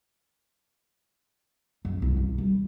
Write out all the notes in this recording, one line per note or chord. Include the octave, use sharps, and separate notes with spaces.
F#2
C2
C2
G3